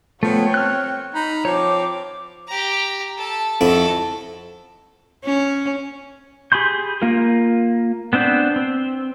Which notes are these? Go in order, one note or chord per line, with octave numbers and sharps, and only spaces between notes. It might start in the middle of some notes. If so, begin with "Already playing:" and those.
F3 A3 B3 C#5 G5
C4 F6 F#6
D#4 B5
F3 C4 C#5 D6
G4 A#5
A4 A5
F2 E4 F#4 A4
C#4
G4 G#4 B5 C6 G6
A#3 F4 A#4
B3 C4 D4 C5
C4